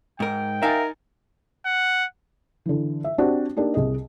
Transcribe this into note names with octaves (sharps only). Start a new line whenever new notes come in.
G#2 A#4 G5
D#4 A#4 E5 F5 G#5 A6
F#5
D3 E3
E5
C4 D4 F#4 G4 C5
A#3 D4 D#4 G4
C2 G#4 D#5